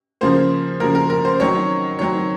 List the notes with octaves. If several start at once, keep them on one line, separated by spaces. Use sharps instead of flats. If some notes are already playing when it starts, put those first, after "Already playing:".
C#3 F3 A#3 C5
C#3 F3 A#3 A#4
A#4
A#4
C5
D#3 F#3 C4 C#5
D#3 F#3 C4 C#5